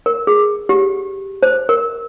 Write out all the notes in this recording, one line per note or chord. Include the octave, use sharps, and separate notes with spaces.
A#4
G#4
G4
C5
A#4